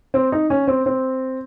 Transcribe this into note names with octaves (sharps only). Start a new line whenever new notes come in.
C4
D#4
C#4
C4
C4